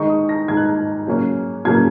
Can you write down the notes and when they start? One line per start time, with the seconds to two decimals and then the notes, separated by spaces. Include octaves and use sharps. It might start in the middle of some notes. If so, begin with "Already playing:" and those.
Already playing: D#3 G#3 D#4 C#6
0.10 D#6
0.29 A#6
0.48 D#3 G#3 D#4 G#6
0.57 F#6
0.65 G#6
1.07 C#3 F#3 A#3 C#4
1.65 C#3 F#3 A#3 C#4 G#6